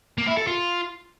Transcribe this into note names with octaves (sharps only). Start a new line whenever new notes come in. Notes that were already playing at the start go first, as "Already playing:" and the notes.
A#3
E4
A4
F4